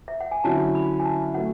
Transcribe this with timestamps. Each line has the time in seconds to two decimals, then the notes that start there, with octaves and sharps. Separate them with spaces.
0.08 E5
0.20 F#5
0.31 G#5
0.44 D3 F#3 C#4 E4 A5
0.75 B5
1.00 G#5
1.05 A5
1.34 F#3 A3 F#5